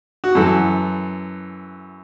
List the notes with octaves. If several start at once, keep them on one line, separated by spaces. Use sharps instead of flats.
F#4
F#2 E3 A4